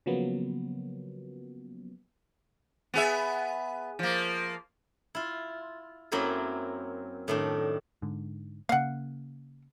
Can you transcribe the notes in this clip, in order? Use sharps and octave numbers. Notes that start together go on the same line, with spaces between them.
C#3 F3 F#3 A#3 B3
B3 G#4 E5
F3 A#3
E4 F4
F#2 F#3 A#3 C4 E4 B5
A2 D#3 D4
G#2 D3
C#3 A#3 F5 F#5